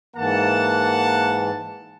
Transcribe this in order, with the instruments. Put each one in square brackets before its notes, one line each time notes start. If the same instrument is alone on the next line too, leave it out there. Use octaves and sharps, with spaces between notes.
[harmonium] G#2 E3 [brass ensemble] A#3 F#5 A5